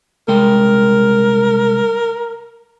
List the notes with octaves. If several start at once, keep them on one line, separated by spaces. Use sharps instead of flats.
C2 G#3 A#4 G5